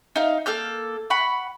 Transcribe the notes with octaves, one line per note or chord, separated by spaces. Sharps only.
D#4 F5
A#3 A4 F6 G6
F#5 B5 C#6